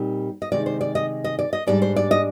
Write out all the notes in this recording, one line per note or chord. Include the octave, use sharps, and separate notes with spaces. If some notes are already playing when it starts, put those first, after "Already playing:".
Already playing: A#2 G3 C4 D#4
D#5
C3 D#3 G#3 D4 D5
C5
D5
D#5
D#5
D5
D#5
G#2 G3 D4 D5
C5
D5
D#5